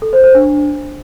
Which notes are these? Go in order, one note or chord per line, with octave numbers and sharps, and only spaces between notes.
A4
C5
C5
D4